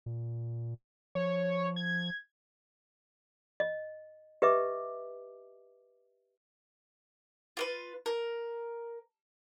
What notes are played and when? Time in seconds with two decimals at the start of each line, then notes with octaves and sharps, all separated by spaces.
0.06 A#2
1.15 F3 C#5
1.76 G#6
3.60 D#5
4.42 G4 B4 D#5 E5 D6
7.57 F4 A#4 B4
8.06 A#4